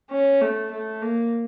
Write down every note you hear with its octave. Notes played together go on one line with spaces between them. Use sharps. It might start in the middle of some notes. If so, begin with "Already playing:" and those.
C#4
A3
A3
A#3